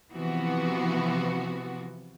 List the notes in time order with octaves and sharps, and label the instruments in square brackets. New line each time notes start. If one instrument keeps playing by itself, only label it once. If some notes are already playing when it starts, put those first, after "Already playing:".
[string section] C3 E3 F3 B3 F#4